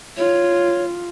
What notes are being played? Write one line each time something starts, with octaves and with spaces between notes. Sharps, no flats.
F4 C#5